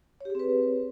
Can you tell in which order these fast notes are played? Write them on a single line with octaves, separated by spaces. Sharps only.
C#5 G4 G#4 C4 B4